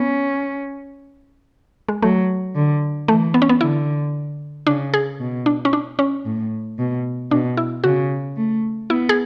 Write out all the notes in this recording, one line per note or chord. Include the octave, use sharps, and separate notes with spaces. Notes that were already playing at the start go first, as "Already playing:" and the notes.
Already playing: B3 C#4
G#3
F#3 A3
D3
E3 A3
B3
C#4
B3
D3 E4
C#3 D4
G#4
B2
D4
C#4
D4
C#4
A2
B2
B2 D4
E4
C#3 F#4
A3
B3 E4
G#4